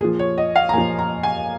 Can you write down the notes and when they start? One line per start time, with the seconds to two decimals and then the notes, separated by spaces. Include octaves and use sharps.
0.01 A#2 G#4
0.04 F3
0.19 C#5
0.38 D#5
0.56 F5
0.69 A#5
0.73 A#2 F3 G#5
0.99 A#5
1.23 G#5